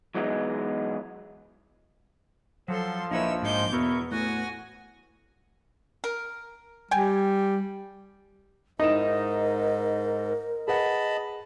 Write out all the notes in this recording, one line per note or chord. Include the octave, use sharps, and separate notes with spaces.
E3 F#3 G#3 B3 D#4
F3 F#3 A4 C6
A#1 D#4 E4 B4 C#5 E6
G#2 G#3 D#4 C6 D6 G6
E2 B2 B3 E4 A#4 C#6
A2 F#4 F#5 G#5 A#6
A#4
G3 G5 G#5
G#2 D#4 E4 A#4 E7
G#4 B4 D#5 F#5 A5 B5